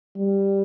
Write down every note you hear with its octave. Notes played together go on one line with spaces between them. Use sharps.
G3